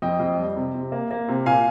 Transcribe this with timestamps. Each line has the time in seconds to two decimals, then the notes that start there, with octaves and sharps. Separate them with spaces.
0.02 F2 D#5 G5
0.20 F2
0.38 G3
0.56 C3
0.74 C3
0.92 A#3
1.11 A#3
1.28 C3
1.46 A#2 F5 G#5